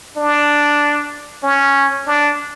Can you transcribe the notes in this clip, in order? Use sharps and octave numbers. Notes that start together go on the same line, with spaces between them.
D4
C#4
D4